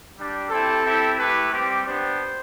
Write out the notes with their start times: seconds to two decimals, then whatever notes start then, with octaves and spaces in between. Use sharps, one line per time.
0.16 G3 D4 G4
0.50 C4 E4 G4 A4
0.84 C4 E4 G4
1.18 A3 E4 G4 B4
1.52 G3 C4 G4
1.86 B3 D4 G4 C5